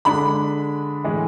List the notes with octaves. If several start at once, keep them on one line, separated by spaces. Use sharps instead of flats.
D3 G#3 D4 B5
A2 E3 G#3